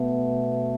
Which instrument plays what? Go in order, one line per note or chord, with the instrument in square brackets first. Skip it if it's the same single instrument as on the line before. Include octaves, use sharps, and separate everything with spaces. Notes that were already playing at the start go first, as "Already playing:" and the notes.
Already playing: [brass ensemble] B2 A3 B3